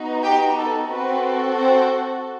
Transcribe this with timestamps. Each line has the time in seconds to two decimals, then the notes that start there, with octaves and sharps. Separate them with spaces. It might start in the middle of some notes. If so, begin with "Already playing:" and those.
Already playing: B3 D#4 F#4
0.24 G4 G5
0.58 A4
0.91 C4 F#4 A4 B4
1.59 C4 C5